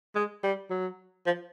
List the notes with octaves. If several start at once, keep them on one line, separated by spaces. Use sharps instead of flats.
G#3
G3
F#3
F3